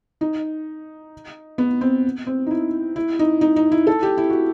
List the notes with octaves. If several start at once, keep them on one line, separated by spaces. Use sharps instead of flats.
D#4
B3
C4
C4
D#4
E4
E4
D#4
D#4
D#4
E4
A4
G4
E4
F#4